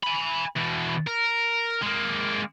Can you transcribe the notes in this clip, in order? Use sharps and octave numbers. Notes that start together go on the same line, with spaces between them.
G#5 B5
E2 B2
A#4
G#3 A#3